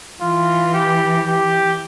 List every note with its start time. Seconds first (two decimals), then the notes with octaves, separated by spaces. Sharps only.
0.21 E3 F4
0.74 G4
1.26 G4